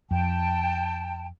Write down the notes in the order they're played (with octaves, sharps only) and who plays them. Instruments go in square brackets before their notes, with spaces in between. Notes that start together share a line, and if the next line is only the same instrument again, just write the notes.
[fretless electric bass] F2 [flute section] G5 A5